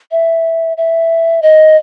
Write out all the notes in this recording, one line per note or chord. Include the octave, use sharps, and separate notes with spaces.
E5
E5
D#5